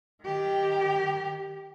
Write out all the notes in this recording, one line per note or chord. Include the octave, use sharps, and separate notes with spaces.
D#3 G4